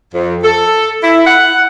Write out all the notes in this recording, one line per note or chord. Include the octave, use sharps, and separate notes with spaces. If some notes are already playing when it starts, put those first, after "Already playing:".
F2
A4
E4
F#5